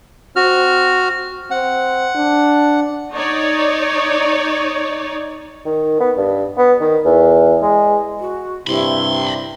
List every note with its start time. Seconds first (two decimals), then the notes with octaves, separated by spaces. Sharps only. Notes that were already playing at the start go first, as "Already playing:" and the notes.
0.36 C4 F#4 F6
1.51 C4 F#5
2.15 D4
3.11 D#4 C#5 D5
5.66 D#3
6.00 B3
6.17 G2
6.58 B3
6.81 D#3
7.05 E2
7.62 G#3
8.20 F#4
8.67 G2 C3 E4 B5 C6